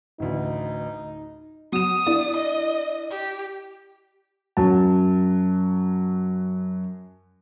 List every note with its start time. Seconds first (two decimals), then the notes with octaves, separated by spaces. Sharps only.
0.20 A1 D2 D#4
1.72 F#3 D#6 E7
2.07 D4 E4 D5
2.37 D#5
3.10 G4
4.57 F#2 F#3 A5